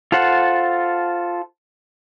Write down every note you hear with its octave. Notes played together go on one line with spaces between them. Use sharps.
F4 A4 C5 F#5